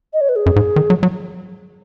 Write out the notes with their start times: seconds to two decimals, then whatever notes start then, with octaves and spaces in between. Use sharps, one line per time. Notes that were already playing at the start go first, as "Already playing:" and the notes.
0.13 D#5
0.21 C#5
0.29 B4
0.36 G#4
0.46 F#2
0.56 G#2
0.76 D#3
0.90 F#3
1.03 F#3